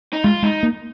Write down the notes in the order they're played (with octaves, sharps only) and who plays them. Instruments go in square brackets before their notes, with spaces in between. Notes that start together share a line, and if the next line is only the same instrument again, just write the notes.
[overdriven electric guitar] D#4
[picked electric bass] G#3 [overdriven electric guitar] F4
[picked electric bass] G#3 [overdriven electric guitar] D#4
[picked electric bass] A#3